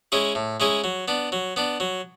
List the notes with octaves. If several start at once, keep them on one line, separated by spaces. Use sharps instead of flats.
G#3 C#4 E4 G#4
A2
G#3 C#4 E4 G#4
F#3
B3 D4
F#3
B3 D4
F#3